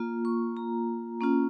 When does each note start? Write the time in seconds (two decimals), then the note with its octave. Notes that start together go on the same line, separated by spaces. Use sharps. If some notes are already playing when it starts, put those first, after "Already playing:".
Already playing: A#3 F4
0.25 C#6
0.57 A#5
1.21 A#3 C#4 F4